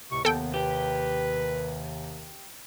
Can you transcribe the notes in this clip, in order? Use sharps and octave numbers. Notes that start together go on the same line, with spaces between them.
C#2 A2 C3 C#6
D#2 C3 D#3 B3 A4 G5
G4 B4